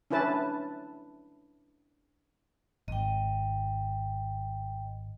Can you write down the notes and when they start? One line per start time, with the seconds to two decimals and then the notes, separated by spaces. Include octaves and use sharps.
0.11 C#4 D4 E4 B4 A5
2.88 G#1 D#5 G5